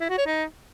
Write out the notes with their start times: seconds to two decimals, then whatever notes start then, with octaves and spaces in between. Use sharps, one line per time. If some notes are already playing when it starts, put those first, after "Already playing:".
0.01 E4
0.09 F#4
0.18 C#5
0.26 D#4